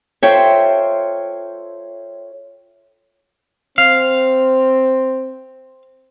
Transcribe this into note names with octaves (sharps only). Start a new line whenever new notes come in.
F4 A4 C5 C#5 E5 G5
C4 F5